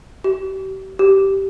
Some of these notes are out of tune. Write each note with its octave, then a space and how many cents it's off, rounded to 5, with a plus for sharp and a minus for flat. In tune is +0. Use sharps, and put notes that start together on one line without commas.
G4 -40
G4 -15